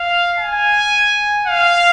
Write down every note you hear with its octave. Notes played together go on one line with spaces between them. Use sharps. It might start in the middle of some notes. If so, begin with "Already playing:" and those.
Already playing: F5
G#5
F5